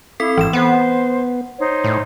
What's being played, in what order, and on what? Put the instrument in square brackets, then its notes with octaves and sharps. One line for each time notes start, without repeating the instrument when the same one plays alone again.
[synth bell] C4 A4 B6 [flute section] E4
[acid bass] G#1 [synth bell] E3 E7
[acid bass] B3 [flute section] C5 [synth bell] F#5
[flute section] D#4 C5 C#5
[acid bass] A2